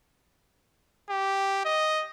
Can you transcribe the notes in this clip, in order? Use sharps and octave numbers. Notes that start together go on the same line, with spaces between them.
G4
D#5